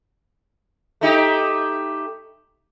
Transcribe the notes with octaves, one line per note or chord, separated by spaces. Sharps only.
A3 D#4 G4